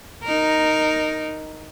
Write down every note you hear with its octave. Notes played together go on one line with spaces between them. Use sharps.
D#4 A#4